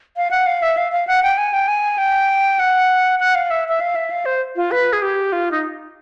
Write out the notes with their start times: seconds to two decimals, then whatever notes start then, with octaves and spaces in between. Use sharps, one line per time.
0.17 F5
0.31 F#5
0.46 F5
0.62 E5
0.77 F5
0.92 F5
1.07 F#5
1.23 G5
1.38 G#5
1.53 G5
1.68 G#5
1.98 G5
2.59 F#5
3.20 F#5
3.35 F5
3.51 E5
3.69 E5
3.80 F5
3.95 E5
4.11 F5
4.26 C5
4.56 F4
4.71 B4
4.93 G#4
5.02 G4
5.33 F4
5.51 D#4